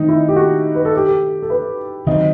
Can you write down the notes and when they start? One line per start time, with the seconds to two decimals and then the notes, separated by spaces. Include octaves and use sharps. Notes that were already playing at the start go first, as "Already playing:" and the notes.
Already playing: D#3 A3 C4 D#4
0.09 E4
0.28 G4
0.36 F#4
0.75 B4
0.85 A4
0.97 G4
1.09 A4
1.42 A4
1.50 B4
2.07 D#3 F#3 C4 D#5